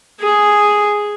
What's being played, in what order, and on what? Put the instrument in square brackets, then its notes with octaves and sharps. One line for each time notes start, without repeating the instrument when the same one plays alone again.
[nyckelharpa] G#4